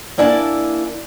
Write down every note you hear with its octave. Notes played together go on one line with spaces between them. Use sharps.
A#3 D4 E4 G#5 A5